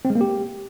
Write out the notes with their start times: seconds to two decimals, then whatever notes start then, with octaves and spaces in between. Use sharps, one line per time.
0.05 C4
0.10 G#3
0.15 A#3
0.21 G4